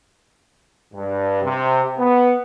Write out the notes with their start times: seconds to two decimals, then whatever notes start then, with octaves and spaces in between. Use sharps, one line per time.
0.94 G2
1.43 C3
1.98 B3